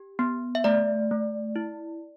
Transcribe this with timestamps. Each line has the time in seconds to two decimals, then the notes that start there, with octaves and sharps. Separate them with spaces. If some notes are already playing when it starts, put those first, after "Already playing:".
Already playing: G4
0.19 B3
0.55 E5
0.64 A3 D5
1.11 A3
1.56 E4